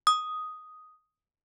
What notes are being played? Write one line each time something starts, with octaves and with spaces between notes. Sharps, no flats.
D#6